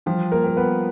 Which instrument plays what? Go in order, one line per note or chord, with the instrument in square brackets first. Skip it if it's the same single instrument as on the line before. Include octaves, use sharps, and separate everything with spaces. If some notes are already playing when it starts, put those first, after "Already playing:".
[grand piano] F3 F4 [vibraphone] G3
[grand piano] A#3 A#4
[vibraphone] G3 [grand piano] A#4
[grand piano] B3 B4